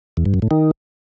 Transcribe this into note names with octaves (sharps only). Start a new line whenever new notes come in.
E2
G2
F#2
A2
D#3